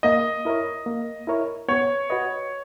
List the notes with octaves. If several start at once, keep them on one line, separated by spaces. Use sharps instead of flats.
A#3 D#5
E4 A#4 C#5
A#3
E4 A#4 C#5
B3 C#5
F#4 B4 D#5